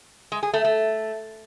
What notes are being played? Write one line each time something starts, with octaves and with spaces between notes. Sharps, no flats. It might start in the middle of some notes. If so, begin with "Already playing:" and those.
G#3
G#4
A3
A3